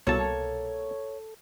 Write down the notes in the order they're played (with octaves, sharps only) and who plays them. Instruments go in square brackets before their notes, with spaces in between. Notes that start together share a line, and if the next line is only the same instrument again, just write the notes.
[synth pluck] C2 B2 [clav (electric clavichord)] A#3 A5 [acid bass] A4 [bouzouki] C#5